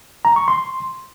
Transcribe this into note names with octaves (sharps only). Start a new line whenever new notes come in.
A#5
C#6
C6